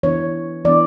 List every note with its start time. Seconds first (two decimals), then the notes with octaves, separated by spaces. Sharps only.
0.03 E3 B3 D4 C#5
0.65 E3 B3 D4 D5